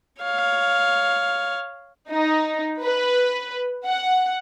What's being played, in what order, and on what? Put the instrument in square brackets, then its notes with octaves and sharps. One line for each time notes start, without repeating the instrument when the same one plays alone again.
[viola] C#5 F5
[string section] D#4
B4
F#5